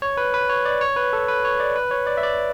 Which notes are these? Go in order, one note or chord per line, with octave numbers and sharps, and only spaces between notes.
C#5
B4
B4
C#5
D5
C#5
B4
A4
B4
C#5
D5
B4
C#5
D5
E5
D5